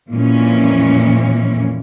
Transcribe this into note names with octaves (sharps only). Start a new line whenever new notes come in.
F2 A#2 E3 G#3 A#3 C#4